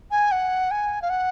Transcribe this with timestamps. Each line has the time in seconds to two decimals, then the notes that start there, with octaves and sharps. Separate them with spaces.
0.11 G#5
0.32 F#5
0.71 G#5
1.02 F5
1.10 F#5